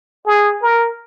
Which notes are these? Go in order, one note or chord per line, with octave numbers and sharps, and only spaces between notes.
G#4
A#4